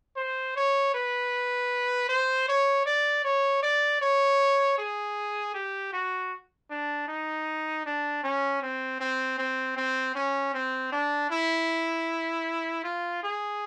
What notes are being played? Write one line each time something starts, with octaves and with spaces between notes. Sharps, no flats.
C5
C#5
B4
C5
C#5
D5
C#5
D5
C#5
G#4
G4
F#4
D4
D#4
D4
C#4
C4
C4
C4
C4
C#4
C4
D4
E4
F4
G#4